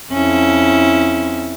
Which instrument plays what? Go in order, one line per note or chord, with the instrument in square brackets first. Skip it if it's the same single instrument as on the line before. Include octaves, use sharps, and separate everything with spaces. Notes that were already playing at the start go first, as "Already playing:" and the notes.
[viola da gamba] F2 C#4 E4